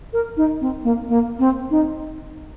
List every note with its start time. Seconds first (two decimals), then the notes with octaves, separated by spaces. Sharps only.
0.13 A#4
0.37 D#4
0.61 C4
0.83 A#3
1.08 A#3
1.39 C4
1.70 D#4